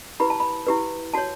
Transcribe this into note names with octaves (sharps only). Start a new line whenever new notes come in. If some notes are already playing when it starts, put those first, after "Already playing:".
E4 G4 B4 B5
A5
B5
E4 G4 B4
F#4 C#5 A5